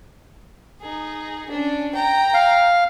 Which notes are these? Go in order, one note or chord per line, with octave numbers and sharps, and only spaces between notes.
D#4 G#4
C#4 D4
G5 A#5
F5